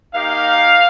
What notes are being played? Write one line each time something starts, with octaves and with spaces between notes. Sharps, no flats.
A#3 D#4 G4 F5